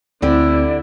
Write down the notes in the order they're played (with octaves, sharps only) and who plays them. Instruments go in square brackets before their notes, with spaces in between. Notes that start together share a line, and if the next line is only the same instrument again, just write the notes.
[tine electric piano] D2 C4 [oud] D3 G4 [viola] E4 [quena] D5